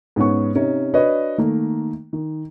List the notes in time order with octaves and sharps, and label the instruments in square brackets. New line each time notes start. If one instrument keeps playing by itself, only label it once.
[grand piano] G#2 B3 C#4 C#6
C3 C#4 D#4
D4 F#4 B4 C#5 D#5
D#3 A3 A#3
D#3